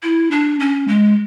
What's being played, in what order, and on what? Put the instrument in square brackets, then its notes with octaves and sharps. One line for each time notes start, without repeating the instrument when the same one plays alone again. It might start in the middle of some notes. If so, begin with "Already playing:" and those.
[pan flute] E4
D4
C#4
G#3